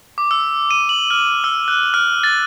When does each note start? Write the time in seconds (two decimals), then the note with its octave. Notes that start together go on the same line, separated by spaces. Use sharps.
0.18 D6
0.31 E6
0.71 D#7
0.89 F#7
1.11 F6
1.44 E6
1.68 F#6
1.94 F6
2.24 A6